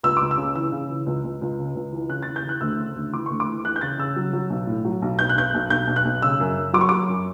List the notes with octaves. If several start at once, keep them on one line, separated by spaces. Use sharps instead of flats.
C#2 E6
C#2 D6
E6
C#3
E3 E6
C#3
E3
C#2
C#2
C#2
C#3
C#2
E3
C#3 F#6
E3 A6
G6
E3 F#6
D2 E6
C#3
D2
E3 D6
D2 C#6
D6
E3
E3 F#6
G6
C#3 A6
C#3 E6
F#3
F#3
B1
A2
F#3
B1
B1 G6
F#6
B1 G6
B1
B1 G6
B1
F#6
B1
C#3 E6
F#2
F#2
F#3 D6
C#6
F#3 D6
F#2